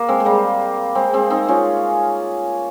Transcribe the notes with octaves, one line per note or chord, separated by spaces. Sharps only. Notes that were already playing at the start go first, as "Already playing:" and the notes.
Already playing: A#3
G#3 C4
G#3
G3 A#3
G#3 C4
G#3 C4
C4 D#4
C#4 F4